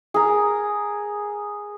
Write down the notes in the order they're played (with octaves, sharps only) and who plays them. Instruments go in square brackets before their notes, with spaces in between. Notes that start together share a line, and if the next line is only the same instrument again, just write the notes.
[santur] G#4 A#4